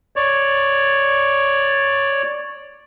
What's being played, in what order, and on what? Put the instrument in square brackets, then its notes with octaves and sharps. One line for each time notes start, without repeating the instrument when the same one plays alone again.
[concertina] C#5 D5